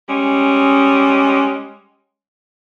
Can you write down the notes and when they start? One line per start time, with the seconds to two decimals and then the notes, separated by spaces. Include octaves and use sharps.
0.08 G3 G#3 C#4